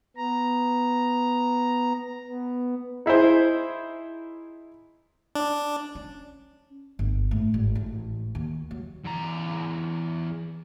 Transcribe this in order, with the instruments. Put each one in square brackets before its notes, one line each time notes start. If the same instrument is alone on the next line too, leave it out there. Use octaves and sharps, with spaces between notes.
[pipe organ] B3 A#5
B3
[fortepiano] D#4 E4 G#4 C5
[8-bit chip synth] D4
[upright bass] C#4
G1
A2
G#1
A1
D#2
F#3
[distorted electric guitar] E2 A#5